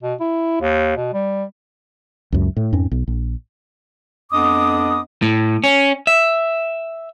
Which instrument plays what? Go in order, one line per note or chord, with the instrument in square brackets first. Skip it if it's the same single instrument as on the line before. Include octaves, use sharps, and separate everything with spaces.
[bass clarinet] B2
E4
D#2
B2
G3
[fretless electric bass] C#2 F#2
A2
F2 G#2 C4 C#4
B1
A#1
[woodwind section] F2 B3 D4 D#5 D6 D#6
[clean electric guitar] A2
C#4
E5